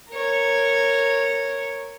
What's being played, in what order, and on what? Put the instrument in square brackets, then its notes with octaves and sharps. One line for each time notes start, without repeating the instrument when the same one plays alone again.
[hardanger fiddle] A#4 C#5